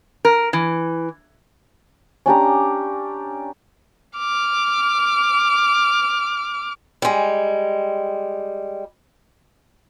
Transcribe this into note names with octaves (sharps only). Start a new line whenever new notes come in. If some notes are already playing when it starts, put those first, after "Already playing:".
A#4
E3
C#4 D4 G4 A#5
D6 F6
G3 G#3